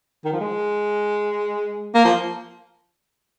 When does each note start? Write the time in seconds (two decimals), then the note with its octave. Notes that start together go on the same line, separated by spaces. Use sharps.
0.25 D#3
0.33 F3
0.40 G#3
1.95 A#3
2.05 F3